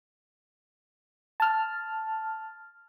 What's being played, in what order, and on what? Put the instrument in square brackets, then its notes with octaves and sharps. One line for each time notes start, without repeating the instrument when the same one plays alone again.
[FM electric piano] A5 F6